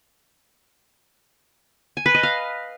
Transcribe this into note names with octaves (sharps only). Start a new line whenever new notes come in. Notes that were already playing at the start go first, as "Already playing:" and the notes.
G#5
B4
D#5
F5